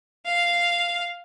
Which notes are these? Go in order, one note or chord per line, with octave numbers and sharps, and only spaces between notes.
F5